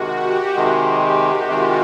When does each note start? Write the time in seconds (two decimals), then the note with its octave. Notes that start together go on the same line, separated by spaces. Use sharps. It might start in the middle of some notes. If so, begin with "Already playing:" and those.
Already playing: C3 D#3 G#3 F#4
0.09 G4
0.56 C3 D#3 G#3 G#4
0.87 G4
1.18 F#4
1.48 C3 D#3 G#3 F4